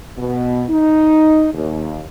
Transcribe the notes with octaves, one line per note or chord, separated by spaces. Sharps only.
B2
D#4
D#2